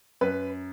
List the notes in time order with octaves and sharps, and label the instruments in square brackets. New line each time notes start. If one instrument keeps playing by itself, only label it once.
[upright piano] F#2 B4